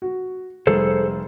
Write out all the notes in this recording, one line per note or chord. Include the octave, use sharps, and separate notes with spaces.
F#4
F1 G3 G#4 A4 C5